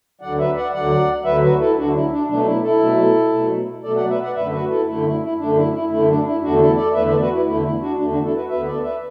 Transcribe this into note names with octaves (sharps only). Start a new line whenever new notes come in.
D2 D3 F#3 D5 F#5
B4 E5
D5 F#5
D2 D3 F#3 D5 F#5
D2 D3 F#3 B4 E5
F#4 B4
E4 A4
D2 D3 F#3 D4 F#4
E4
D4
B2 F#3 A3 D4
E4
E4 A4
B2 F#3 A3
B2 F#3 A3
B2 F#3 A3 A4 D5
D5 F#5
B4 E5
D5 F#5
F#2 D3 A3 B4 E5
F#4 B4
E4 A4
F#2 D3 A3 E4
E4
E4
F#2 D3 A3 D4
E4
E4
F#2 D3 A3 E4
D4
E4
E2 D3 A3 D4 F#4
E4 A4
A4 D5
E2 D3 A3 B4 E5
A4 D5
F#4 B4
E4
E2 D3 A3 E4
E4
D4 F#4
E2 D3 A3 D4
D4 F#4
E4 A4
F#4 B4
D2 D3 B3 B4 E5
A4 D5
B4 E5